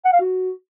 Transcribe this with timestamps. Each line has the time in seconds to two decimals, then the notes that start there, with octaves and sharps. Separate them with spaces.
0.05 F#5
0.13 F5
0.21 F#4